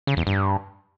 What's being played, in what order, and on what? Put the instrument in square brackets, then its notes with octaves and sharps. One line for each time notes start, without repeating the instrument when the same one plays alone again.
[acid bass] C#3
E2
G2